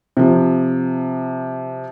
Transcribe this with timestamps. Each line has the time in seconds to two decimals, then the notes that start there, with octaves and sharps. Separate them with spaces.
0.17 C3 F3